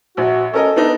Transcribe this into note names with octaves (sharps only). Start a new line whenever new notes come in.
A#1 F#4
C#4 A4 A#4 D#5
B3 D4 D#4